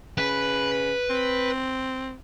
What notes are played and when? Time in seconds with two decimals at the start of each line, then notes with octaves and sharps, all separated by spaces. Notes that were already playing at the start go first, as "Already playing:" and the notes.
0.18 C#3 B4
1.10 C4